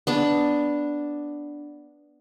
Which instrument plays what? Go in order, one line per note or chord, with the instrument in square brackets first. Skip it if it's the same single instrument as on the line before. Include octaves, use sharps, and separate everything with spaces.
[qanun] B3 D4